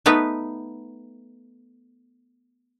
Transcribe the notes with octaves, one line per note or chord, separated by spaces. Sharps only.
A3 B3 D#4 B4